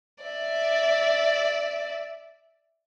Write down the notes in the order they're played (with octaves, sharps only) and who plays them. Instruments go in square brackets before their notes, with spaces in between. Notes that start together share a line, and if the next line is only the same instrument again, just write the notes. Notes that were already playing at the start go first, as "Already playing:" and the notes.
[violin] D5 E5